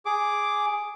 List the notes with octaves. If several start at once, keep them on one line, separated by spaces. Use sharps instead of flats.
G#4 D6